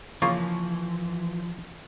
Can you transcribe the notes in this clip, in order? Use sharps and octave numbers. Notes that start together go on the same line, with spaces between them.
C#3 E3 F3 A#3 F4 C#6